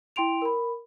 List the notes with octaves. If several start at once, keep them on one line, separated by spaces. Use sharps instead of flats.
E4 G5 C6 D7 F7
A#4 B5